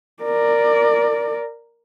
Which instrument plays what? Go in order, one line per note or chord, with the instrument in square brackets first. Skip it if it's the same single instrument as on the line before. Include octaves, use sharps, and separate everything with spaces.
[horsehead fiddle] A#4 D5